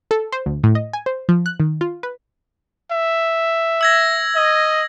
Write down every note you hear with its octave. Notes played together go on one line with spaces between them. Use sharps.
A4
C5
D2
A2
D#5
G#5
C5
F3
F#6
D#3
F4
B4
E5
E6 G#6 A#6
D#5